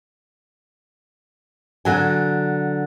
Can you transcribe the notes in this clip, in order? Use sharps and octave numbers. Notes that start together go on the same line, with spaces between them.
D3 F#3 G#5